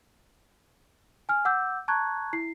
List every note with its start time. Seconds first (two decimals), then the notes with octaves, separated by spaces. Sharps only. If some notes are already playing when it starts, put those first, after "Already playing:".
1.29 G#5 F6
1.45 F#5 D6 E6 G6
1.88 A5 A#5 C#6 F#6 G#6
2.33 E4 C7